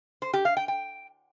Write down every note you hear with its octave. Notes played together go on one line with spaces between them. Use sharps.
C5
G4
F5
G5
G5